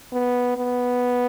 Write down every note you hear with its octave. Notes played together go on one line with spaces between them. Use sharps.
B3
B3